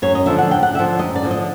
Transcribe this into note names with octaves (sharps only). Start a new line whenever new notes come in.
F#2 C#5
D#5
D3 F3 E5
F#5
F#2 G5
F#5
D3 F3 E5
F#2 D#5
D5
D3 F3
D#5